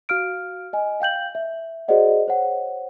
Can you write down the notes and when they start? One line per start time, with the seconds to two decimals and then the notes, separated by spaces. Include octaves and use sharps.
0.09 F#4 F5 F6 D7
0.73 D#5 G#5
1.00 F5 G5 G6 F#7
1.35 E5
1.88 F#4 G#4 C5 D5 D#5 F#5
2.28 C5 C#5 F#5